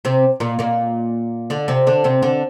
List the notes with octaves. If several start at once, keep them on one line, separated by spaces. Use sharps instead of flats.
C3 C4
A#2 A#3
A#2 A#3
D3 D4
C3 C4
D3 D4
C3 C4
D3 D4